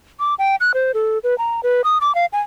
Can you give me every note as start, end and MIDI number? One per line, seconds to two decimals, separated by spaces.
0.20 0.35 86
0.39 0.56 79
0.60 0.72 90
0.74 0.92 72
0.94 1.18 69
1.24 1.37 71
1.38 1.61 82
1.63 1.82 71
1.84 1.98 87
2.01 2.14 86
2.15 2.26 77
2.33 2.40 80